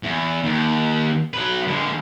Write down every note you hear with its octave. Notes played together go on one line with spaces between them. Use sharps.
E2
D#2
F#3 B4
D3 G#3